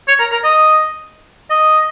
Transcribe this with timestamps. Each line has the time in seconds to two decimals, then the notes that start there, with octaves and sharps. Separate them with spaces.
0.08 C#5
0.19 A#4
0.31 A#4
0.44 D#5
1.50 D#5